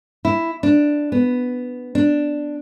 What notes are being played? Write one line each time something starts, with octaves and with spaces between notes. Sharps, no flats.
E4
D4
B3
D4